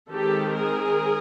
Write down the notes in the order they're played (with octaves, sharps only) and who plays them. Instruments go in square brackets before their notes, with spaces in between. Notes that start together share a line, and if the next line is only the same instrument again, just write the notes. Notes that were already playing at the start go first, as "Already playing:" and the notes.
[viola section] D#3 G#3 C4 G4 A4
G#4 A#4